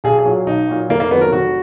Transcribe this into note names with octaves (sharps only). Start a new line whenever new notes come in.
B1 G#4
G#4
A#2 F#3
B1 D#4
A#2 F#3
F1 A#3
A#3
F2 D#3 F#3 B3
A#4
F1 F#4